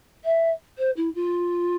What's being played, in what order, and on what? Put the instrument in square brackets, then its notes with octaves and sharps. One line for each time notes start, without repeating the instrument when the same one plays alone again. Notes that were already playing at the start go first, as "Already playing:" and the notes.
[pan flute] E5
C5
E4
F4